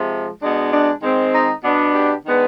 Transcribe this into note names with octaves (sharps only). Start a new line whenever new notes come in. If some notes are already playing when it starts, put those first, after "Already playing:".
Already playing: C3 F3 G#3
B2 G#3 D4
D4
D#3 G#3 C4
D#4
B2 B3 D4
G4
D#3 G#3 B3 D4